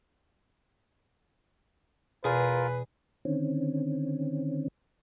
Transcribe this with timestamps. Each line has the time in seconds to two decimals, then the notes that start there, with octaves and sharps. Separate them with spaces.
2.24 E2 B2 F4 G#4 A#4 B4
3.25 D3 D#3 C4 C#4